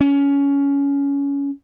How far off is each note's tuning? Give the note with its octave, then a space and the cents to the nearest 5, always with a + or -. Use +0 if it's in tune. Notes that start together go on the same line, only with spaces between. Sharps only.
C#4 +20